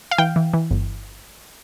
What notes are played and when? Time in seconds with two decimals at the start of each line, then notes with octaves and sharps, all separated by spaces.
0.11 F5
0.18 E3 G5
0.36 E3
0.54 E3
0.70 G1